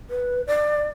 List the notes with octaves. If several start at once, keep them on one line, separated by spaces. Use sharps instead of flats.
B4
D5